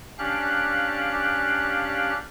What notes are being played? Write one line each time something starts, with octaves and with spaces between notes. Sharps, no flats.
C#4 D4 G4 F5 F#6